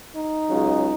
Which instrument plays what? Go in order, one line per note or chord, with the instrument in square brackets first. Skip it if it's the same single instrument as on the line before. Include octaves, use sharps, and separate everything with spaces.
[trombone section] D#4
C#2 C#3 F#3